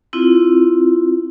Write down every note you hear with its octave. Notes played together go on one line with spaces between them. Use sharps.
C4 E4 F4